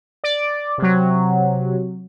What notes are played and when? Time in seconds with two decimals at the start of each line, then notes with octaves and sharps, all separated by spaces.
0.24 D5
0.78 C3 F#3